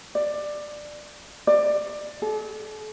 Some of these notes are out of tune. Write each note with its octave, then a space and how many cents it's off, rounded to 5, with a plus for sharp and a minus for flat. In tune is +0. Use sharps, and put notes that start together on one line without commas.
D5 +15
D5 +20
A4 -40